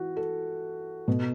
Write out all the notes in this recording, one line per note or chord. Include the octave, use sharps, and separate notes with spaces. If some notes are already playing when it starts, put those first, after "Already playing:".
Already playing: E3 F#4
A4
B2